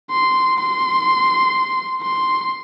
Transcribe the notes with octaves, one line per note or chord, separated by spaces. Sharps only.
C6
C6
C6